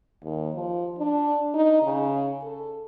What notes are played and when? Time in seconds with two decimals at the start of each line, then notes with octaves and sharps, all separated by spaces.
0.22 D#2
0.55 F3
0.99 D4
1.54 D#4
1.83 C#3
2.43 A4